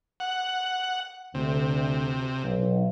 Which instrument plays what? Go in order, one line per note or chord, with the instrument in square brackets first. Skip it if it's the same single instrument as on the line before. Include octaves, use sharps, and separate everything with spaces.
[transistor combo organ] F#5
[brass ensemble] D2 [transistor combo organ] C3
[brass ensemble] B1